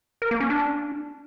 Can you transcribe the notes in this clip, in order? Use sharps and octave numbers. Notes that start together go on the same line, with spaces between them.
A#4
A#3
C#4
D4